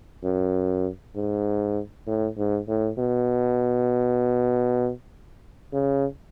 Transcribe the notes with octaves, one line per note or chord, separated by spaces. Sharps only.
F#2
G#2
A2
G#2
A2
B2
C#3